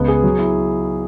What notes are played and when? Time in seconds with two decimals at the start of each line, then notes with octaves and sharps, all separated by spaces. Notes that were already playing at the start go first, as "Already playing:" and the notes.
Already playing: C#2 B3
0.08 G#4
0.23 F#3
0.39 E4